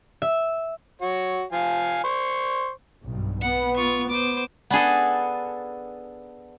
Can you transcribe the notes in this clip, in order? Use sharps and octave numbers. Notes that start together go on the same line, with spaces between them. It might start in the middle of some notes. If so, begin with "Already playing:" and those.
E5
F#4 C#5
F3 F5 G#5
C5 C#6
B1 G2
B3 F#5
F4 C#6
B3 C5 D6
B3 D4 G#4 A4